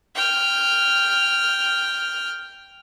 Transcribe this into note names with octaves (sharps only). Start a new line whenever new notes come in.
G5 F6